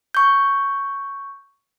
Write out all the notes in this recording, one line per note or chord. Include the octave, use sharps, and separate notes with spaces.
C#6 G6